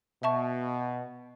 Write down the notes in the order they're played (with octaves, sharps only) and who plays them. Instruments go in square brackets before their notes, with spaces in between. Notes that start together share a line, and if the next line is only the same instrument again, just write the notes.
[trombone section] B2 [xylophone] E5 A5 C#6